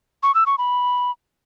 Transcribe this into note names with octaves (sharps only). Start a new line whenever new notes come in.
C#6
E6
C#6
B5